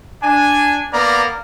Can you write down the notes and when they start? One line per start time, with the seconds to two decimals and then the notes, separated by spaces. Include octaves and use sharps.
0.23 D4 G#5
0.93 A#3 B3 D5 A#5